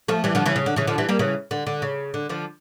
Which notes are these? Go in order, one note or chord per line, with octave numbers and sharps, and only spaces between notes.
F3 A3
E3 G3
D3 F3
C#3 E3
C#3
D3
C#3 E3
D3 F3
E3 G3
G3 A#3
C#3 E3
D3
D3
C#3
D3
D3 F3